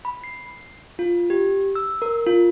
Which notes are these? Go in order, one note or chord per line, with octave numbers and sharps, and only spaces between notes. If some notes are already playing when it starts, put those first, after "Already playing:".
B5
C7
F4
G4
E6
A#4
F4